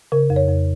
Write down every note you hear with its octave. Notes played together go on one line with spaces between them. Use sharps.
C#3 A#4
F2
C#5
F2